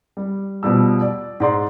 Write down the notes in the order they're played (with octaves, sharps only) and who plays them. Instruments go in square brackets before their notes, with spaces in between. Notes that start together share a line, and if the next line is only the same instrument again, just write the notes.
[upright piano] G3
B2 F3 G3 E6
D5
G#2 D5 C6